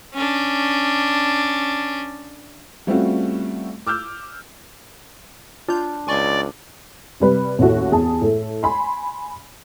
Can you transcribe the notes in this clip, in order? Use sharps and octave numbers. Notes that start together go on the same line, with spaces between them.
C#4 D4
G3 A3 C4 C#4 F4 F#4
D6 E6 F6 G6
D4 F4 G6
C#2 D5 G#5 C6 C#6
C3 G3 B4
A1 D#2 E4 F#4 A4
E2 G#4 A5
A2 A3
G#5 B5 C6